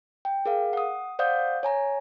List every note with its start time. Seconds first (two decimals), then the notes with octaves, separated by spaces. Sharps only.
0.25 G5
0.46 G#4 A#4 F5
0.73 F#5 D#6
1.19 C5 D5 F5 F#5 D#6 G6
1.63 C#5 G#5 A#5